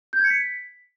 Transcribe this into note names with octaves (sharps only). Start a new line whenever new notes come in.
G6
G#6
C#7
B6